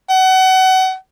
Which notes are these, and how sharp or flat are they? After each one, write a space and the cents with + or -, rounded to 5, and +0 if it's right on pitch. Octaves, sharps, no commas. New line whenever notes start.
F#5 +30